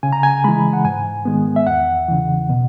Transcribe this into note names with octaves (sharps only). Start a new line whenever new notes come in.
C#3 G#5
A#5
G#5
E3 G#3 B5
F#5
G#2 G#5
D#3 G#3 B3
E5
E2 F#5
C#3 E3
B2